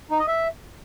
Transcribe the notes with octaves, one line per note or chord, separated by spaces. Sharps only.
D#4
D#5
E5